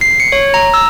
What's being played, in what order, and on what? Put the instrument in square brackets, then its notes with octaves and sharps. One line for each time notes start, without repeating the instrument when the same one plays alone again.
[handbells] C7
C#7
C#5
A#5
E6